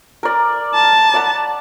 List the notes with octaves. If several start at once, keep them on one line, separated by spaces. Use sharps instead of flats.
A#4 D5
A5
D5 F#5 B5